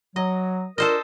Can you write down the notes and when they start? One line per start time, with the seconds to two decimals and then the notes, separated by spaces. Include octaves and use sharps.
0.16 F#3 D#5
0.78 D4 F4 A4 A#4 C5 D#5